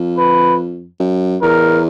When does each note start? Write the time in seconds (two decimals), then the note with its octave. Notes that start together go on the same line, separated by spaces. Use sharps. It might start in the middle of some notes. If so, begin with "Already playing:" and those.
Already playing: F2
0.18 B4
1.00 F#2
1.42 E2 A#4